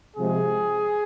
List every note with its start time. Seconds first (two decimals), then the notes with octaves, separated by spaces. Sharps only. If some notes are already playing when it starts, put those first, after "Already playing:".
0.17 C3 F3 G#3 C4 G#4